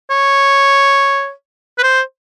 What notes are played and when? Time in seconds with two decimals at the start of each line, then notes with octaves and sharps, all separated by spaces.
0.10 C#5
1.78 B4
1.83 C5